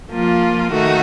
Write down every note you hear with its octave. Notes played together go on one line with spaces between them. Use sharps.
F3 A#3 F4
D#3 A3 D#4 F#4